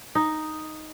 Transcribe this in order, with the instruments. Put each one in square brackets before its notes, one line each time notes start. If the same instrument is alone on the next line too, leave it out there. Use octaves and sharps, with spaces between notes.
[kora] D#4